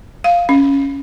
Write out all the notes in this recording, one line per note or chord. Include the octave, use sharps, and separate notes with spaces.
F5
C#4